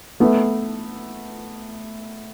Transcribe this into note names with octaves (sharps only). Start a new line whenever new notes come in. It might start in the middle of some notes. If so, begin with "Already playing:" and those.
A3 B3